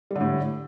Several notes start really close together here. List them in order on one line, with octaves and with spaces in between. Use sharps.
G3 D3 A2